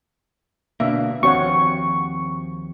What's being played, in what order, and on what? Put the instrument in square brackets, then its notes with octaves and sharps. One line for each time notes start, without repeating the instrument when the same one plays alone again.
[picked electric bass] B2 D3 A#3 [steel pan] D4 E5
[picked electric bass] D#2 F3 C4 [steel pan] F#4 C#5 F#5 [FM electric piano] C#6